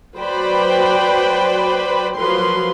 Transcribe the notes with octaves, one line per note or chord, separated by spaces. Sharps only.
F#3 B4 C5 D5 G5 B5
F3 F#3 A#4 B4 C6